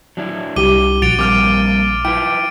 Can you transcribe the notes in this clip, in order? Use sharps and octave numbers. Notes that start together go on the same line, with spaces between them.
F#3 D4 E4
C2 G4 D6 D#7 G7
A#1 F#4 A6 D7 F7
G3 A#3 C4 D6 F6 F7
E4 F4 B4 G5 D7